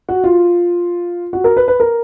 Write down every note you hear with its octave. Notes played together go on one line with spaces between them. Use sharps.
F#4
F4
F#4
A#4
B4
B4
A#4